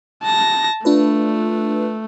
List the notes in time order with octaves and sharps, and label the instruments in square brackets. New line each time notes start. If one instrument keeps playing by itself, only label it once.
[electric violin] A5 A#6
[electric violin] A3 [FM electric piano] D4 F4 B4